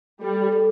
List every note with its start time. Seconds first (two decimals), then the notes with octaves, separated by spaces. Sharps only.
0.22 G3 A4
0.52 A4